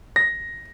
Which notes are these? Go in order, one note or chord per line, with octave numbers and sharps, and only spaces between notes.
A#6